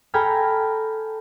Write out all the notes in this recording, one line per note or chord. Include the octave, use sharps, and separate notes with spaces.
A4 G5 G#5 A#5 B5 F6